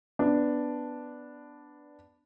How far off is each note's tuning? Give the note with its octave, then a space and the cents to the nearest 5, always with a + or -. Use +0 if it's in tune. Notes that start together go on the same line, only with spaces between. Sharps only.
B3 +5 D4 +0